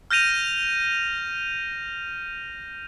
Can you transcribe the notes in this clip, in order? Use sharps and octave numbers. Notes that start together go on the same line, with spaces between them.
F6 G6 A#6 D#7 F7